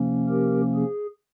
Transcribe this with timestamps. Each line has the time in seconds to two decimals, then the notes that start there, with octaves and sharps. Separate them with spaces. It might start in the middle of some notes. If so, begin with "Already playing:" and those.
Already playing: C3 F3 A#3 C#4
0.29 G4 A#4
0.74 G#4